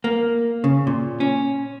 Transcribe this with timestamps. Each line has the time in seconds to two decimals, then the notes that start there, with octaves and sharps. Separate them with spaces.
0.04 A#3
0.64 C#3
0.87 A#2
1.20 C#4